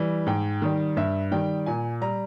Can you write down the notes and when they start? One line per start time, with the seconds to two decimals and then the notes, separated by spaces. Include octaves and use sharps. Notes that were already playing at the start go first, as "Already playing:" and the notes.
Already playing: E3 G3
0.27 G#2 G5
0.62 D#3 G3
0.97 G2 E5
1.31 D#3 G3 G5
1.66 A#2 G#5
2.01 G3 A#5